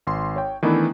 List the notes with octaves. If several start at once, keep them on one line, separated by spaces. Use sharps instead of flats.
G#1 C6
C#5 G5
D#3 E3 A3 B3 D4 E4